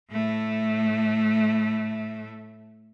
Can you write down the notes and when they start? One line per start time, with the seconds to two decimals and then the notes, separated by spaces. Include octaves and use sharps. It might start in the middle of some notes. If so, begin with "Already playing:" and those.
0.12 A2 A3